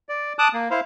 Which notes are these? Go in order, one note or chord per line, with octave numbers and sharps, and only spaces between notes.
D5
A5 D6 D#6 F#6
A#3
E4 C5 F5